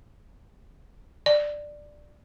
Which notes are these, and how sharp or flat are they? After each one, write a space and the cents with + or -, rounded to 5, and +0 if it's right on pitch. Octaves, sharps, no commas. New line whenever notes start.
D5 +10